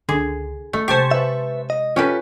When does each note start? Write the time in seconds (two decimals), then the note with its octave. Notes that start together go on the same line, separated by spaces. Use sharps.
0.09 C#2 D3 G#4
0.73 A3 C#4
0.88 C3 G#3 G4 C5 G#5 A5 C#6
1.11 B4 E5
1.70 D#5
1.96 C#4 F4 G4 A4 B4